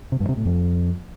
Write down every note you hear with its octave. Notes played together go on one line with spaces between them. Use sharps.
C3
G2
C3
A2
F2